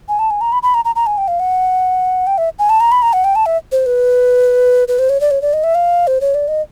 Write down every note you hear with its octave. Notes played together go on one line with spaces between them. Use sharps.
G#5
A5
G#5
A#5
B5
B5
A#5
A#5
A#5
G#5
G5
F5
F#5
G5
E5
G#5
A5
A#5
B5
A#5
F#5
G5
A5
E5
C5
B4
B4
C5
C#5
D5
C#5
D5
D#5
E5
F5
C5
C#5
D5
D#5